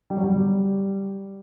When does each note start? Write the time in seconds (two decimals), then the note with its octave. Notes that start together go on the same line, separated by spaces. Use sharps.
0.10 G3
0.17 F#3
0.24 G3